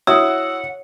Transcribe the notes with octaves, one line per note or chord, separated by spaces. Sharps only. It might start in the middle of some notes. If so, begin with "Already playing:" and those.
E4 F#4 C#5 F#5 D#6 E6